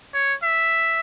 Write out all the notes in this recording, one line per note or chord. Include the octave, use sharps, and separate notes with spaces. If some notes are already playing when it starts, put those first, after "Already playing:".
C#5
E5